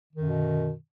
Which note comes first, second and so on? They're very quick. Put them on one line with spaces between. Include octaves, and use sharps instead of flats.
D3 D#3 F#2 B2